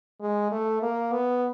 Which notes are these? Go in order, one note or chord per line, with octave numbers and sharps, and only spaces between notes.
G#3
A3
A#3
B3